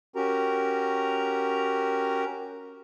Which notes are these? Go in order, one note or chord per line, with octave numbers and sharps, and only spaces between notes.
C#4 F#4 G4 A#4 A#5